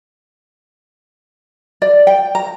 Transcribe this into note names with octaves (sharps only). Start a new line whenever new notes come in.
D5
G5
A#5